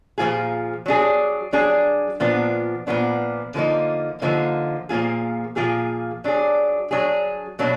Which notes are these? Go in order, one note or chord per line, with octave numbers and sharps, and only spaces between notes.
A#2 F3 B3 F4 G#4
F#3 D4 G#4
F#3 D4 G#4
A#2 F3 B3 D4
A#2 F3 B3 D4
D3 F3 A#3 D#4
D3 F3 A#3 D#4
A#2 F3 A#3 F4 G#4
A#2 F3 A#3 F4 G#4
F#3 D4 G#4
F#3 D4 G#4
B2 F#3 A#3 D4